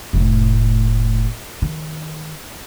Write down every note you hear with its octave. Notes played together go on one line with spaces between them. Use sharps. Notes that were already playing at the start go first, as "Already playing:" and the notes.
F1 A2
D#3